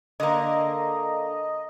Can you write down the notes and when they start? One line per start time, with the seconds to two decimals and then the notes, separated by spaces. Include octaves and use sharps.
0.20 D3 A#3 D#5